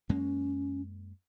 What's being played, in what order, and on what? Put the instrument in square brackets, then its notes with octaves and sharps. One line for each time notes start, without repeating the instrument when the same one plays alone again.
[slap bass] F#2 G#3 A#3 [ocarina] C#4